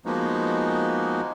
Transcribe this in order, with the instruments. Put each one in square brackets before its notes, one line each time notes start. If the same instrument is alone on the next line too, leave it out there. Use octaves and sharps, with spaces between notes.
[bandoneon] F3 G#3 A#3 B3 D#4 F#4